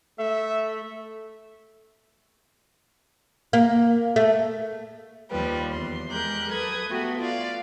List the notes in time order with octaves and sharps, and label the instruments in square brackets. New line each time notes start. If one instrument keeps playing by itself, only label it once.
[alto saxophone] A3 [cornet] E5
[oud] A#3
A3
[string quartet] D#2 F3 G3 B4
E2 C6
G#3 G4 A#4 F#6 G6
F#3 A4 B4 D#6 G#6
A3 B3 F#4 G4 A4
F4 D5 F5